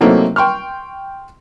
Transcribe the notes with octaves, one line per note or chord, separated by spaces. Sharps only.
C3 F#3 A3 A#3 C4 D#4
G5 C6 C#6 F6